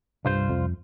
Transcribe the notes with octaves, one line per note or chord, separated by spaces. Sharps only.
C2 G2 F4 C5
F2